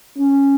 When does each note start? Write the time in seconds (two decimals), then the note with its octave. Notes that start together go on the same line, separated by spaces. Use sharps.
0.16 C#4